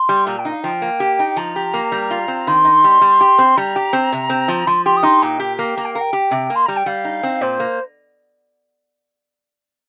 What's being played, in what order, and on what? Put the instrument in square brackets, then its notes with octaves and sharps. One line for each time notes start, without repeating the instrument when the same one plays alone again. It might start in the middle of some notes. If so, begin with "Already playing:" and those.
Already playing: [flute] C6
[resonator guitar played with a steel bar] G3
[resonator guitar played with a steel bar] A#2 [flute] A#5
[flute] G5
[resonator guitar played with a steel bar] D#4
[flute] F5
[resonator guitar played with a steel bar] F3 [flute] G5
[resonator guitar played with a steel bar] A#3
G4
D#4
[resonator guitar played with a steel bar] F3 [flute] A#5
[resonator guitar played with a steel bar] G4
A#3
G3
F4
C4
[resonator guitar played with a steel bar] D#3 [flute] C6
[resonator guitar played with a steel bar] D#4
G3
G3
G4
C4
[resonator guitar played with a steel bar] G3 [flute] A#5
[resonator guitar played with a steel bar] G4
C4
C3
C4
F3
[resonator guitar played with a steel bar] F3 [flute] C6
[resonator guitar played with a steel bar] G4 [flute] C6
[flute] D#6
[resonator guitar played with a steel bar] D#4 [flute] C6
[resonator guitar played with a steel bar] A#2 [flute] G5
[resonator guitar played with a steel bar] G4
A#3
[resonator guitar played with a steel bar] A#3 [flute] A#5
[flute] G5
[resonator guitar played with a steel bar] A#4 [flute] F5
[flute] G5
[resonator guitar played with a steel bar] G4
C3
[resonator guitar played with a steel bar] A#3 [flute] C6
[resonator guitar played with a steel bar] G3 [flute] A#5
[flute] G5
[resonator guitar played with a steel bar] G3 [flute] F5
[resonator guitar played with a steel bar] D#4
C4
[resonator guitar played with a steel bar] A#2 [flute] C5
[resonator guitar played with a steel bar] A#3